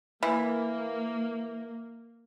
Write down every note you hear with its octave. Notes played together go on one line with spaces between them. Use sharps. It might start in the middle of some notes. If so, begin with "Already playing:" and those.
E3 A#3